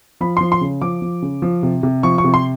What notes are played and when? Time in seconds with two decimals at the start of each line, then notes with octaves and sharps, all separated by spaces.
0.21 F3 B5
0.37 F3 C6
0.52 C6
0.61 C#3
0.82 F3 D6
1.02 F3
1.22 C#3
1.42 F3
1.63 C3
1.83 C3
2.03 F3 C#6
2.18 C#6
2.24 C3
2.34 C6